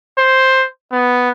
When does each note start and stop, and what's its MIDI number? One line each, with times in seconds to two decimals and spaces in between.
0.18 0.66 72
0.92 1.30 59